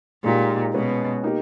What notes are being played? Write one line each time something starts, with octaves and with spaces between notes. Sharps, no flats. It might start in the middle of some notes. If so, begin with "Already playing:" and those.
A#2 G#3 D#4 G4
B2 G#3 C#4 G#4 B4
A#3 D#4 G4